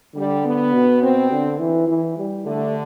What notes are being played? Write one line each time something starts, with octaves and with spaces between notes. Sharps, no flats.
D3 G3
B3
B2
C4
D3
E3
E3
G3
D3 A3